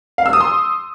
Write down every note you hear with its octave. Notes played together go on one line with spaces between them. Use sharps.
F5
E6
D#6
C6